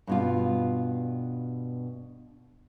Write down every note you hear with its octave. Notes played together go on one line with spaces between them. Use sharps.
G2 B2 F4